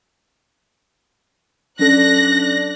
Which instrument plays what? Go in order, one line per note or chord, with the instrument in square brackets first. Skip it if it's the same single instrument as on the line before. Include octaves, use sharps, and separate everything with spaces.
[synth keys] F#3 C#4 A4 [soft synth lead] D4 [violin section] F#6 A#6